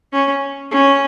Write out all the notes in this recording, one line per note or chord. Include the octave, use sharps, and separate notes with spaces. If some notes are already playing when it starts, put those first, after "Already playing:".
C#4
C#4